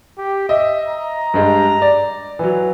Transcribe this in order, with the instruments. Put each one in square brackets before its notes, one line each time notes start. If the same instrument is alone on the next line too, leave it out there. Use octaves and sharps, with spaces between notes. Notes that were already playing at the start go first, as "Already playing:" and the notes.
[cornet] G4
[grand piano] D#5 [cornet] E5
[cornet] A#5
[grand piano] G2 G#3
D5
E3 F#3